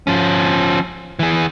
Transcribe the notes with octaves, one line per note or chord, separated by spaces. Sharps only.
F3 C#4
E3 G#4